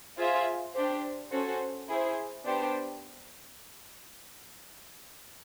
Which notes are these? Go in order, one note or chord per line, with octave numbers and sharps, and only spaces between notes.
F4 G#4 C5 E5
D4 G4 C5
C#4 F#4 A4 C5
E4 G#4 C5
B3 D4 G4 C5